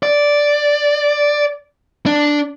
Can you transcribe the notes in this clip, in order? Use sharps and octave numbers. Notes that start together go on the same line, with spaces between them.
D5
D4